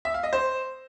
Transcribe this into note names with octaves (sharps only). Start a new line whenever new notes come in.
E5
F5
D#5
C5